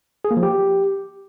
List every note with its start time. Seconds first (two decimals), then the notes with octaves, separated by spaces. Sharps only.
0.25 G#4
0.31 A#3
0.37 F3
0.43 G4